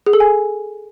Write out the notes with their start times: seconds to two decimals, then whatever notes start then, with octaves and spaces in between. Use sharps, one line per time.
0.06 G#4
0.13 A4
0.20 G#5